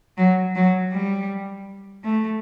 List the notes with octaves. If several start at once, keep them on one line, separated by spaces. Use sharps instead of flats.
F#3
F#3
G3
A3